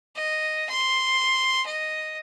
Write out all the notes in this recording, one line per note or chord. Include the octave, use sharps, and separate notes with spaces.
D#5
C6
D#5